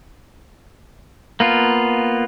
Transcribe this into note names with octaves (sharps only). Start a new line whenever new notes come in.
A#3 B3 F4